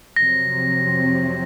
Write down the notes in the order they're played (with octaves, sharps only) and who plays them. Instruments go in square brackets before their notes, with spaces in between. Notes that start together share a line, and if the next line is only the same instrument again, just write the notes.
[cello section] F2 C3 F#3 C4 [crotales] A#6